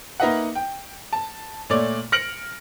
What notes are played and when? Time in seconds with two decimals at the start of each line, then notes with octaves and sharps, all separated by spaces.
0.20 A#3 D#4 B4 D#5 E5 F#5
0.55 G5
1.13 A5
1.70 A#2 A3 C#5 D5
2.12 F6 A#6 C#7 D7 F#7